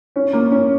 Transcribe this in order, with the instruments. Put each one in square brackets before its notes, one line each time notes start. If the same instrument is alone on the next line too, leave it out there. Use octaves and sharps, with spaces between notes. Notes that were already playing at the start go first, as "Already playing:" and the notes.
[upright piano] C#4
A#3
C#4